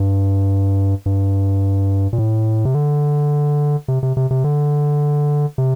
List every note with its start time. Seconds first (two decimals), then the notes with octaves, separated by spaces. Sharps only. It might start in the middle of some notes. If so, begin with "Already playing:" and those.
Already playing: G2
1.06 G2
2.13 A#2
2.18 A2
2.65 C3
2.75 D3
3.88 C3
4.03 C3
4.17 C3
4.31 C3
4.44 D3
5.58 C3